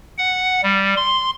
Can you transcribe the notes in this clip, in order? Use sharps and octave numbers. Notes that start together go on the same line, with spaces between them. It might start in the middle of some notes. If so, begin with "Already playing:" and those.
F#5
G3
C6